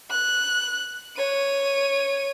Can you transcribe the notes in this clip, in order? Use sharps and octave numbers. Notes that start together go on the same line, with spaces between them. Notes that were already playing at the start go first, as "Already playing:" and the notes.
F#6
C#5 D#7